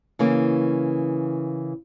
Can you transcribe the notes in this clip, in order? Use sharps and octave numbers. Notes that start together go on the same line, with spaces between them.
C#3 E3 A#3